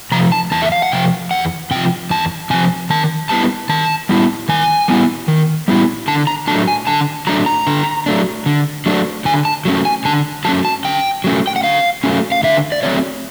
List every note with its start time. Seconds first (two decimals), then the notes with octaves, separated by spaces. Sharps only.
0.12 C3 F3 A#5
0.32 A5
0.51 E2 A5
0.62 E5
0.72 F5
0.82 F#5
0.92 C3 F3 G5
1.31 E2 F#5
1.71 C3 F3 G5
2.10 E2 A5
2.50 C3 F3 G#5
2.90 D#3 A5
3.29 G3 B3 E4 A5
3.69 D#3 A5
4.09 G3 B3 E4
4.49 D#3 G#5
4.88 G3 B3 E4
5.28 D#3
5.68 G3 B3 E4
6.08 D3 A5
6.27 A#5
6.48 F#3 A3 D4 A5
6.68 G#5
6.87 D3 A5
7.27 F#3 A3 D4 A#5
7.46 A#5
7.67 D3
8.06 F#3 A3 D4
8.46 D3
8.86 F#3 A3 D4
9.25 D3 G#5
9.45 A5
9.65 F#3 A3 C#4
9.85 G#5
10.05 D3 A5
10.45 F#3 A3 C#4 A5
10.65 A5
10.85 D3 G5
11.24 F#3 A3 C#4
11.47 G5
11.56 F#5
11.64 D3 F5
12.04 F#3 A3 C#4
12.32 F5
12.43 D3 E5
12.72 D5
12.83 F#3 A3 C4 C#5